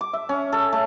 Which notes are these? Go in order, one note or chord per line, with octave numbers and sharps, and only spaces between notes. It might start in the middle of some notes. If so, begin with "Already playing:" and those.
D6
E5
C#4
A4
A3